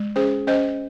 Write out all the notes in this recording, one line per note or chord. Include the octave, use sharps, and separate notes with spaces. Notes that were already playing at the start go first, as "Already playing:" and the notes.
Already playing: G#3
C#4 G#4 C5
C#4 C5 D#5